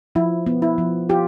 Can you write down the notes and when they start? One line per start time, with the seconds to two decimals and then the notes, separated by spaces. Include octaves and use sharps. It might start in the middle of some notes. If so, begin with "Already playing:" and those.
0.15 F3 E4
0.46 B3
0.62 E4
0.78 F3
1.09 F4 G4